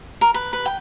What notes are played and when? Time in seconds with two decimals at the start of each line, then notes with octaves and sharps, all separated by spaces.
0.21 A#4
0.34 B4
0.53 B4
0.66 G5